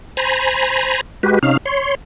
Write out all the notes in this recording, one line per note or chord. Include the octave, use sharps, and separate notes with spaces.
C5 G#5 A#5 B5
G#3 F#4 G4 B4
C3 C#4 D#4 F5
C#5 C6